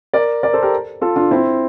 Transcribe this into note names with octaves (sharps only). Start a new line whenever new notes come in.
A#4 D5
A#4 D5
A4 C5
G4 A#4
F4 A4
D4 F4
C4 E4